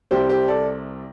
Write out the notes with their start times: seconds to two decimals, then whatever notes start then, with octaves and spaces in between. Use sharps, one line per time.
0.11 C2 C3 G3 G4 C5
0.29 G4 C5
0.48 A4 D5